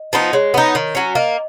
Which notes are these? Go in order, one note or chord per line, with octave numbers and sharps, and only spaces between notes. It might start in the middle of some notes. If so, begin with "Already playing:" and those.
Already playing: D#5
F3 B3 D#4
G#3 C#5
B3 D#4
D#3
F#3 C#4
A#3 D#5